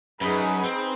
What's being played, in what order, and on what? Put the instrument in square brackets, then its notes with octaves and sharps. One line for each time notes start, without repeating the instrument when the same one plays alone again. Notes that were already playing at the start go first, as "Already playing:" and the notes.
[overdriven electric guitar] F#2 [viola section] D#4 G#4 B4
[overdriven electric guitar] C4